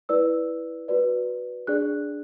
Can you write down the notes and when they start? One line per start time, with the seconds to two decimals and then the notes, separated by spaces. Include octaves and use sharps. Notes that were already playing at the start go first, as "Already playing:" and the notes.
0.09 E4 B4 D5 E6
0.88 F#4 B4 D5
1.67 D4 G#4 D5 F#6